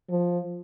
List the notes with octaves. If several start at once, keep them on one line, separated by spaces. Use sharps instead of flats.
F3